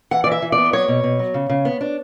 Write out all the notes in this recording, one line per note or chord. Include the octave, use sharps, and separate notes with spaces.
E3 F#5
D5
E3 E5
E3
D5
B3
F#3 C#5
B2
B2
F#3
C#3
C#3
B3
D4